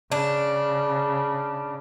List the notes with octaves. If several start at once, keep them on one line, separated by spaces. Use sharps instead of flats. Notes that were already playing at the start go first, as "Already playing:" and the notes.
C#3 D4